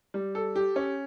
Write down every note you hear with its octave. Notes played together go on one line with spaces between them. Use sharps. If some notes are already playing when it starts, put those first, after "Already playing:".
G3
A4
G4
C#4